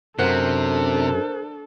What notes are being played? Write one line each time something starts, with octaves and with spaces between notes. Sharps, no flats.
F#2 C3 D4 A4 A#4 C5 F#6